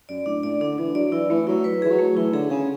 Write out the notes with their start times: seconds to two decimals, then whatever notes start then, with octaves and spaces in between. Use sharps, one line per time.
0.09 F#2 D5
0.26 A2 D4
0.43 A2 D5
0.60 D3 D4
0.78 E3 D4
0.95 F#3 D5
1.12 E3 E4
1.30 E3 A3
1.47 F#3 E4
1.64 B4
1.82 E3 G#4
1.90 F#3
1.99 A3
2.16 E3 E4
2.33 D3 G#4
2.50 C#3 G#4